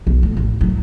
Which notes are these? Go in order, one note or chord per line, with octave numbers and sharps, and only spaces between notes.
B1
A2
A1
A2 F#3